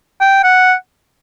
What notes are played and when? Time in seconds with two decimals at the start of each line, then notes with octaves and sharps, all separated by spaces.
0.21 G5
0.44 F#5